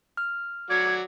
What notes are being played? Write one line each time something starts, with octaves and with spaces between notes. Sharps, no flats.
F6
F#3 D5 F#5 G#6